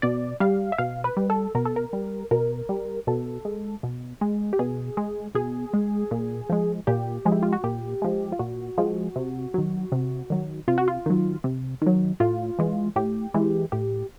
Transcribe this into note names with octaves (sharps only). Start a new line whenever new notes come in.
B2 D5
G3 F5
E5
B2 F5
B4
G3
A4
B2 A#4
A4
A#4
G3
B2 A#4
G3
B2 A4
G#3
B2
G#3
G4
B2 G#4
G#3
B2 G#4
G#3
A#2
F3 G#3
A#2 G4
F3 G#3
E4
F4
F#4
A#2 G4
F3 G#3
F4
A#2 F#4
F3 G#3
C3
D#3 F#3
C3
D#3 F#3
C3 F4
F#4
F4
D#3 F#3
C3
D#3 F#3
A2 F4
E3 G#3
A2 G4
E3 G#3
A2 G4